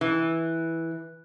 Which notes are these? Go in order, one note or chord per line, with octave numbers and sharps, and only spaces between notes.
E3